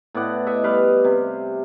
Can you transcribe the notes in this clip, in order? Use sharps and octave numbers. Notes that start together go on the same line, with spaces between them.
A2 B3 D5 F#5
D#5 E5 F#5
G3 B4 F5
C3